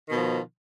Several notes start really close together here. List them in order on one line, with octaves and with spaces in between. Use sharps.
D#3 B2 F3